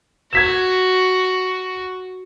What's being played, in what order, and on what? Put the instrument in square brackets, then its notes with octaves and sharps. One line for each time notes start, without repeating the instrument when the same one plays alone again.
[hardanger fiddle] F#4 [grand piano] G#6 B6 E7